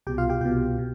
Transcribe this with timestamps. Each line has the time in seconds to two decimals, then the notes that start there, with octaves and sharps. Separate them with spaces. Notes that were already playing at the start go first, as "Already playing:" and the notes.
0.07 C2 B2 G4 G5
0.18 F4 F5
0.30 G4 G5
0.41 C2 B2 G4 G5
0.78 B2